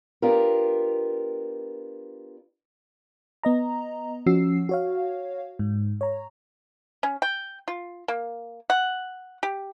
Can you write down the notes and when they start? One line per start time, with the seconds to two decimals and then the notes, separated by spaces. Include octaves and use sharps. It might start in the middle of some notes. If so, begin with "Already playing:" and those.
0.22 B3 D4 F4 G4 A#4
3.43 B3 D#5 A#5
4.26 F3 C#4 F#4 E6 C7
4.69 F#4 C#5 F5
5.59 G#2
6.01 C#5 A#5
7.03 C#4
7.22 G5
7.68 F4
8.08 A#3
8.70 F#5
9.43 G4